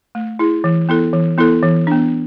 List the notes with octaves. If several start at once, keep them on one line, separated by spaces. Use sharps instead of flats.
A3
E4 G#4
E3
B3 E4 A4
E3
B3 E4 A4
E3
B3 D4